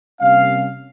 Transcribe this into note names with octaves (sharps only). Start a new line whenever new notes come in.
C3 G3 A#3 C#4 F5